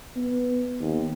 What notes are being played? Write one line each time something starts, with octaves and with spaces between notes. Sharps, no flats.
B3
D#2